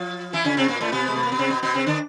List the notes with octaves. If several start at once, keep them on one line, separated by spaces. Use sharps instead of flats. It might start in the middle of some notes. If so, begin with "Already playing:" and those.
Already playing: F3 F4
E3 E4
C#3 C#4
C3 C4
A#2 A#3
A2 A3
B2 B3
G#3
A3
A#3
B3
C3 C4
B2 B3
B2 B3
C3 C4
D3 D4